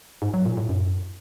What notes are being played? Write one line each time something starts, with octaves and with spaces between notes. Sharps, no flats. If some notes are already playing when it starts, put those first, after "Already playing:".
G#2
F#3
A#2
A2
F#2